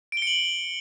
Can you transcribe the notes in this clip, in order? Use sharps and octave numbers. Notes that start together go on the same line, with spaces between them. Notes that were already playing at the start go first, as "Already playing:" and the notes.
C#7 D7 F#7 G7